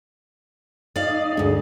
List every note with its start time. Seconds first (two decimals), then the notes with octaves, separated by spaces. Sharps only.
0.96 D#4 D5 D#5 F5
1.37 D2 G2 G#3 D4